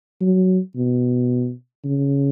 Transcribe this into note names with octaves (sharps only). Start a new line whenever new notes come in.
F#3
B2
C#3